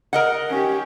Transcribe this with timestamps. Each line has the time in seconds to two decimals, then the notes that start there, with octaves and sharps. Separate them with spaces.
0.13 A#4 D#5 F#5
0.49 C#4 G4